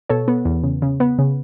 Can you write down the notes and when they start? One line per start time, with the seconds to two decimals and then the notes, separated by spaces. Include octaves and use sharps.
0.09 B2 A4 C#5
0.28 B3
0.45 E2
0.63 C#3
0.82 C#3
1.00 B3
1.18 C#3